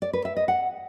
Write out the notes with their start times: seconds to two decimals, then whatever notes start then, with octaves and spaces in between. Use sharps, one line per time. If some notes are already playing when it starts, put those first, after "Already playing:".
0.02 D5
0.13 B4
0.25 E5
0.37 D#5
0.48 F#5